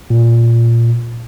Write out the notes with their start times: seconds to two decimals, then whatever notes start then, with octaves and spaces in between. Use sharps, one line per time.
0.10 A#2